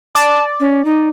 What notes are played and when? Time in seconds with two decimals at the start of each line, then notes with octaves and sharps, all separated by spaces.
0.15 D5 A5
0.60 C#4
0.85 D#4